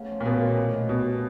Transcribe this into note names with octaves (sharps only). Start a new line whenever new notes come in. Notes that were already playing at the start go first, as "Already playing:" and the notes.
Already playing: C#3 A3 B3
F3
A#2
F#2 B2
D#3
A2
A3
G2 B2